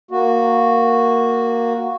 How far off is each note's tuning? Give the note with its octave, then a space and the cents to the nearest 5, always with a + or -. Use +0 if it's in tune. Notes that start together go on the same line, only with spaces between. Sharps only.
A#3 +0 F#4 -5